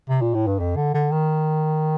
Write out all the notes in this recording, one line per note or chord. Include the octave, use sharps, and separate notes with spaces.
C3
A#2
A2
G2
F2
D3
D3
D#3